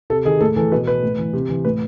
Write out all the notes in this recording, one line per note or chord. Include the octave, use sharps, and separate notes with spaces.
C3 A4
D#3 G#4
A2 A4
E3 A4
B2 B4
B4
A2
E3
C3
E3
A2 B4